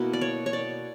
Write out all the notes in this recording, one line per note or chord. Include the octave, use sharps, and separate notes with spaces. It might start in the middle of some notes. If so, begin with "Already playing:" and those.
Already playing: B2 A#3 E4
D5
C#5
C#5
D5